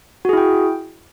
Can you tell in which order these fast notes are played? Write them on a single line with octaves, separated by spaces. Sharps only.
F#4 G#4 E4 G5